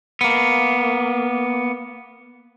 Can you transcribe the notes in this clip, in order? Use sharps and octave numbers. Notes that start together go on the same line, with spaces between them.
A#3 B3